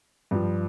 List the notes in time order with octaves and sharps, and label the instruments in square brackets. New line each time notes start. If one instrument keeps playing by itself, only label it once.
[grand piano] G2 F3